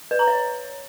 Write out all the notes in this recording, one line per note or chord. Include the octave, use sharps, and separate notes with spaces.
B4
A#5
C#5